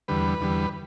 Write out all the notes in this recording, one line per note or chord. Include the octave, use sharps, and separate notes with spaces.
E2 D3 G3 B4
E2 D3 G3